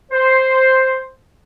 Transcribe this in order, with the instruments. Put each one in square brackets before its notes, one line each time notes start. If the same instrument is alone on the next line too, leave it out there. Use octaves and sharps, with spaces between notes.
[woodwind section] C5